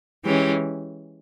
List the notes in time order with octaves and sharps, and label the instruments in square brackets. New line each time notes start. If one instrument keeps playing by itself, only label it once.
[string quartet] E3 G#3 C#4 G4